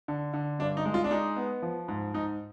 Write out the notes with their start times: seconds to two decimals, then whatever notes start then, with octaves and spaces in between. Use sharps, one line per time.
0.08 D3
0.34 D3
0.59 G2 D4
0.77 D#4
0.85 G#3
0.94 F4
1.04 D4
1.11 G#3 D#4
1.36 B3
1.62 F3
1.88 G#2
2.14 G#2 D#4